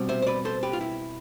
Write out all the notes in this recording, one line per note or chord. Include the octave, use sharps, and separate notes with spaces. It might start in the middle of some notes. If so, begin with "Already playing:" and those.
Already playing: B2 G3 C4
C5 E5
C5
B4 D5
A4 C5
G4 B4
F4
E4